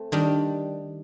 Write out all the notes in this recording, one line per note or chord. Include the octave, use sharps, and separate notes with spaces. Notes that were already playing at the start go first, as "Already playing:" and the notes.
Already playing: A3 C4
D#3 G3 D4